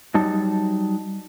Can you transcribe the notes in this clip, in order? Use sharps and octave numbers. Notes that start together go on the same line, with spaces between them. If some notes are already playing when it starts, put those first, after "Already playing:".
F#3 G3 D#4 A5